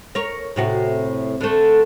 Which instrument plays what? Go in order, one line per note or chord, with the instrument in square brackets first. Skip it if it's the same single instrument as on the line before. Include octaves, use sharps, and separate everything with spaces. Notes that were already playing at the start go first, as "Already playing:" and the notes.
[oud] A#4 C#5
A2 C3 F#4
D3 A3